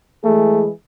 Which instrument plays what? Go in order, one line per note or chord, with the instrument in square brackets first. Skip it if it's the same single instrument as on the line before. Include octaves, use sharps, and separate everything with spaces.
[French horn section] E3 G#3 G#4 [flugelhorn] A3